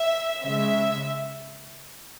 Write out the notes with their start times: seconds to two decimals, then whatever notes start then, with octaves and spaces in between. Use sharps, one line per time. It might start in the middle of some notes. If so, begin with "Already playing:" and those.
Already playing: E5
0.43 C#3 G#3 E5